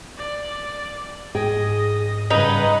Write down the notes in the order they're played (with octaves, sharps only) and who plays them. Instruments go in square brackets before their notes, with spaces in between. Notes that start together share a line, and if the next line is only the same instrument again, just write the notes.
[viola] D5
[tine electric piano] G#2 [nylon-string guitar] G#4 G5 [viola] D#5
[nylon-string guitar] G2 C#3 [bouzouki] D#4 [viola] B4 F#5